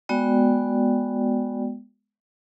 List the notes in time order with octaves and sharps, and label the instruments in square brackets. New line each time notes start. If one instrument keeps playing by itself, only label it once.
[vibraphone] G#3 B3 F#4 D5 G5